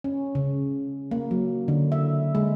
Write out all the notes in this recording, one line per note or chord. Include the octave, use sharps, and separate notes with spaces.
C#4
C#3
A#3
F#3
D3
E5
G#3